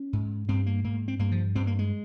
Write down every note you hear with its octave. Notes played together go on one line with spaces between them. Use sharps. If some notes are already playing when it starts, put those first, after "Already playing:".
Already playing: C#4
G#2
G2 C4
A#3
G#2 A#3
C4
G2 A#3
F3
G2 C4
A#3
G#3